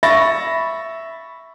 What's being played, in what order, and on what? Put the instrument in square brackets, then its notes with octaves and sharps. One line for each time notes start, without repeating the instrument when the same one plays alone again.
[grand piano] E5 B5 C#6 A6 A#6